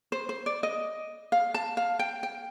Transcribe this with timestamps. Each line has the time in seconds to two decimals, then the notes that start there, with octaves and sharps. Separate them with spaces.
0.12 C5
0.29 C5
0.46 D5
0.63 D#5
1.32 F5
1.54 A5
1.77 F5
1.99 G5
2.23 G5